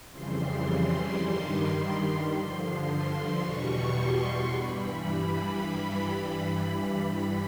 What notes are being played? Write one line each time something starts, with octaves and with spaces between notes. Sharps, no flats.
F2 C#3 E3 G3 C6
G2 D#3 G3
G2 D3 F3 C6
E2 B2 G3 C#6
C6
G2 E3 G3 B5